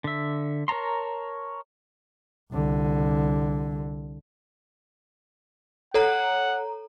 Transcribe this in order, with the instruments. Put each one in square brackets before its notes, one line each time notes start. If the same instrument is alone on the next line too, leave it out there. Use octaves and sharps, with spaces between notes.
[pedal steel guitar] D3 E5
A#4 C#5 A5 A#5 C6
[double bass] C2 D3
[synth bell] A4 C#5 A#5 [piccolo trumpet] F#5